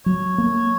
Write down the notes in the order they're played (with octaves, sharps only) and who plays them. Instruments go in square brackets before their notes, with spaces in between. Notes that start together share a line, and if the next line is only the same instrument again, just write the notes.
[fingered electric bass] F#3 [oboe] C#5
[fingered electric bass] A#3